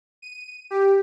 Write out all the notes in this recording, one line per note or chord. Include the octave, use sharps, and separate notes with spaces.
D#7
G4